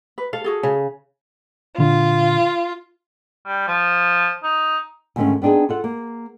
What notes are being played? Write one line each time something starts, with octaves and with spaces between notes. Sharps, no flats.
B4
A4 F5
F#4 G#4 A4
C#3
A#2 D3 F4
G3
F3
D#4
G#2 D3 D#3 G3 A3 C#4
B3 C4 D4 D#4 G#4
F4 A4 F#5
A#3